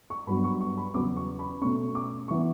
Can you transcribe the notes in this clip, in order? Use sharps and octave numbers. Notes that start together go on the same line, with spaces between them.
C#6
G2 F#3 B3 B5
C#6
C#6
B5
E2 C#3 F#3 B3 D6
C#6
B5
B2 A3 C#4 C#6
D6
E3 B3 C#6